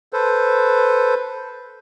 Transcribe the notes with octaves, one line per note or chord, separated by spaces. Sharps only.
A4 B4 C5